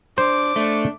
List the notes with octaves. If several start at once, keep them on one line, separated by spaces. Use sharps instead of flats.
D4 C5 D6
A3 D4